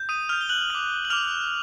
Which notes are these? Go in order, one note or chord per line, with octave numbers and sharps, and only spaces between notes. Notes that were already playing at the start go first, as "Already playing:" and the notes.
Already playing: G6
D#6 D#7
D#6 F6 G6 F7
G7
F#6 F#7
D6 F6
F#7
D6 F6 F7